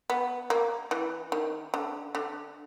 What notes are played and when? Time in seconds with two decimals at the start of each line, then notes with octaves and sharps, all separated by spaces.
0.10 B3
0.50 A#3
0.91 E3
1.32 D#3
1.74 D3
2.15 D3